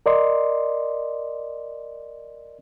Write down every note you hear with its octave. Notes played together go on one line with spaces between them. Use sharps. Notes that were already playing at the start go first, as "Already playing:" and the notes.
A#4 D5 D#5 C6